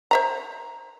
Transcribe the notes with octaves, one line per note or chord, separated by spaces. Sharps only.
C5 E5 A#5